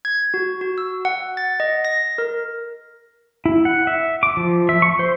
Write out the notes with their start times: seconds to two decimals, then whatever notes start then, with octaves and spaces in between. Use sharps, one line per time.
0.05 G#6
0.34 F#4
0.61 F#4
0.78 E6
1.05 F#5
1.37 A6
1.60 D#5
1.85 A#6
2.18 A#4
3.46 E4
3.65 F#5
3.87 E5
4.23 D6
4.37 F3
4.69 E5
4.82 C#6
4.99 C5